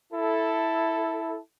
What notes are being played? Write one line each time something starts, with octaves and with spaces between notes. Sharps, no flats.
E4 A4